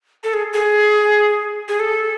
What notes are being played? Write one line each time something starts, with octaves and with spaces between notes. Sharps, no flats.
A4
G#4
G#4
G#4
A4